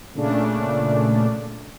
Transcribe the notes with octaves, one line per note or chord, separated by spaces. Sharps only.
A#2 C#3 A3 D4